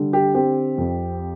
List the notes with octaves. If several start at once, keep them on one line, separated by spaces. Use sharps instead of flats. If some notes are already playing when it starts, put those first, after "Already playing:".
Already playing: D3 G3
G4
C4 G4
F2